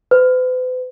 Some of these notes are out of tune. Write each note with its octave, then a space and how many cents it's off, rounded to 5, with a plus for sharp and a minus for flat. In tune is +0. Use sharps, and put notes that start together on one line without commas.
B4 +45